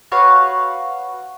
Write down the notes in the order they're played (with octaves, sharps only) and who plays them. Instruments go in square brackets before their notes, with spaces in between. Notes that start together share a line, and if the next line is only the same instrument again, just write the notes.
[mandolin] F#4 B4 C#5 F5